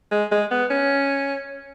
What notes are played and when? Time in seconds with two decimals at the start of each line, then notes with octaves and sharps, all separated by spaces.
0.12 G#3
0.31 G#3
0.51 B3
0.70 C#4